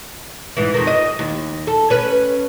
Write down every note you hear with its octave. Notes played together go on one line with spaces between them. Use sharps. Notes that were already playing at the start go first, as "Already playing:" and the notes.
G#2 E3
F2 D#3
D#5
D#2
A4
C#4 B4